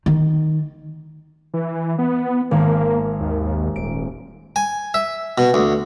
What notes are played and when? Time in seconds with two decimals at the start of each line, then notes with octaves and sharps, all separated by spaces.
0.06 D#3
1.54 E3
1.99 B3
2.51 G#1 A#3
3.20 D#2
3.76 D#1 D7
4.56 G#5
4.94 E5
5.38 B2
5.54 D2